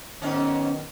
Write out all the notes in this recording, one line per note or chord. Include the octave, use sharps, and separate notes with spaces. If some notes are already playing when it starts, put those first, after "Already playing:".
G#2 D#3 F#3 B3 C#4